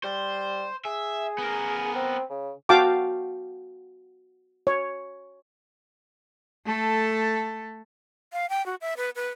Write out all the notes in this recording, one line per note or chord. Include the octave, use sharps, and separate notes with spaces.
G3 C5
G#4 E5
B3 A#4
C4
C#3
F#4 F5 G5 A5 D6
C#5
A3 A4
F5
G5
F#4
E5
B4
B4